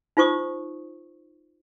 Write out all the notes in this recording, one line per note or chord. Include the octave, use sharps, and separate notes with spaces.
D#4 F4 C5 C#6 D#6